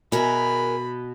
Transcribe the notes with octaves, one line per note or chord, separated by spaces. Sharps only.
B2 G#4 A#4 E5 B5